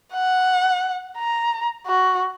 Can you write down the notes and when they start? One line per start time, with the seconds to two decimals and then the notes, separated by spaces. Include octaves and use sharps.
0.13 F#5
1.18 A#5
1.86 F#4